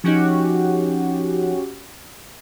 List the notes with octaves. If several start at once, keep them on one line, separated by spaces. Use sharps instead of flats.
F3 C#4 D#4 F#4 G4